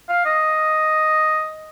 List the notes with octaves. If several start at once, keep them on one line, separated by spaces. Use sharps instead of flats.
F5
D#5